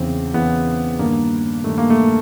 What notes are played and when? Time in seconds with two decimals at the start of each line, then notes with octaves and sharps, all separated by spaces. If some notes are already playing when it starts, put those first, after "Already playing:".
Already playing: E2 C#3 E3 C4
0.33 E2 C#3 E3 B3
0.99 G2 D#3 A#3
1.64 G2 D#3 A3
1.78 A#3
1.90 A3